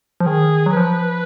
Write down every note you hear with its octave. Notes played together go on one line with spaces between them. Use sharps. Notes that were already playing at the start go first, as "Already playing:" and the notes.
F3
D#3 G#4
F#3
F3 B4